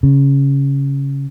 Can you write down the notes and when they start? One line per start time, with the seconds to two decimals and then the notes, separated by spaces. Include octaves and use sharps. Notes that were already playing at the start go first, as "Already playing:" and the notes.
0.03 C#3